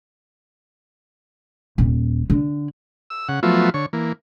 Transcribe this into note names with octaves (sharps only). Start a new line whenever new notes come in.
D#1
D3
E6
C#3 F#5
F3 F#3 A3 B3 F4 E5
D3 C#5
E3 A#3